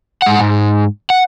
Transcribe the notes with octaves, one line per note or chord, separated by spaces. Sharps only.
G#2 F#5
G#2
F#5